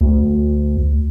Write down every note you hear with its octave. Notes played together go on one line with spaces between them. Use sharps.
D2